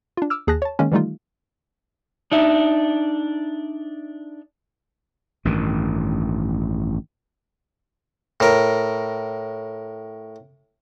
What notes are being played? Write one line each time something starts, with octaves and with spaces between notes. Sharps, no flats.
D4 F4
D6 E6 F6
D#2 G#4 A5 F#6 A#6
C#5 A5
D#3 G#3 A#3 C#4
D#3 E3 G3 A3 D#4 F4
D4 D#4 E5
A1 G2 D#3
A2 A#4